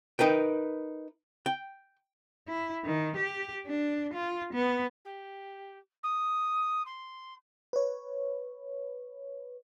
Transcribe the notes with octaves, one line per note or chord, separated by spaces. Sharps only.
D#4 A#4 B4 G5
G5
E4
D#3
G4
D4
F4
B3
G4
D#6
C6
B4 C#5